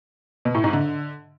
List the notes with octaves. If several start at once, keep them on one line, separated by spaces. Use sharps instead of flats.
B2
A2
G#2
D3